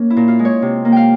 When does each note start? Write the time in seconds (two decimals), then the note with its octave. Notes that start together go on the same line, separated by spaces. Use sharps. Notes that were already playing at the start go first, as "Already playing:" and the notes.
Already playing: A#3 C#4
0.10 E4
0.17 A#2
0.28 F4
0.39 G#3
0.45 C#5
0.62 C3
0.85 A#3
0.92 F5 G5